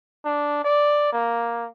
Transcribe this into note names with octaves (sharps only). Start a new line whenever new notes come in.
D4
D5
A#3